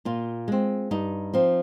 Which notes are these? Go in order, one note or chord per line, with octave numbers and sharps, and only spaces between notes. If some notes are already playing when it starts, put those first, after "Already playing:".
A#2 F4
G#3 C4
G2 D#4
F3 C4